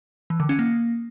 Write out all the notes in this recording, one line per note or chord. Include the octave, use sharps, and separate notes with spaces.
E3
D3
C#4
A#3